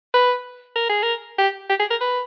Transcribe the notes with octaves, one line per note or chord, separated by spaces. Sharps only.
B4
A#4
G#4
A#4
G4
G4
G#4
A#4
B4